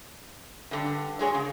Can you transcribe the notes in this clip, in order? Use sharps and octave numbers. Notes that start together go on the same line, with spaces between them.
G2 D3
F#3 G#3 G#4 C#5
C#3